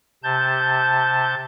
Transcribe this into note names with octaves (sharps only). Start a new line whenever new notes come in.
C3 A5 G6